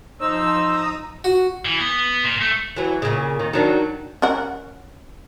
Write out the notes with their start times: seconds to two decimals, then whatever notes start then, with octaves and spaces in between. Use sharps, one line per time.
0.20 F3 D#4 C5 E6
0.65 A#5 D#6
1.24 F#4
1.65 E3
1.79 B3
2.24 A#2
2.41 A3
2.76 E3 F#3
3.02 A#2 C#3
3.39 D#3
3.53 D#3 F#3 D4
4.22 C#4 A#4 F#5